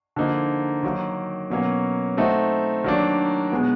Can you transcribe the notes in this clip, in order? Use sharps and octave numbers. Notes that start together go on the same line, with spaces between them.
D3 F3 A#3 D#4
D#3 F#3 A#3
B2 F#3 A#3 C#4
A3 C4 D#4 F#4
D#3 F#3 A#3 D4
B2 G#3 B3